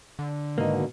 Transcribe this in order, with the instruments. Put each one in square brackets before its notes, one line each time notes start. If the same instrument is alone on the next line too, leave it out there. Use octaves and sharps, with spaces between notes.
[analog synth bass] D3
[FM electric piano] G#2 D#3 G#3 [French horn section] B2 [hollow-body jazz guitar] A#3 D#4